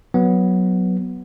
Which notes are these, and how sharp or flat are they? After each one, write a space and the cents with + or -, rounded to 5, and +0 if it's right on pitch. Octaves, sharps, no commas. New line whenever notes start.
F#3 +0 B3 +0